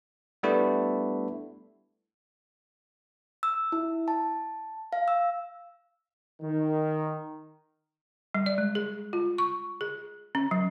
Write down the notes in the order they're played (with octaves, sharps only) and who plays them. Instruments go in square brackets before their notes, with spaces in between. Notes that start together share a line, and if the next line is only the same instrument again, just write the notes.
[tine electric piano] G3 A3 B3 D4 E4
[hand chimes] E6
E4
A5
F5
E6
[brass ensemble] D#3
[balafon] G3
D5
G#3
G#4
F4
C#6
G#4
C#4
F#3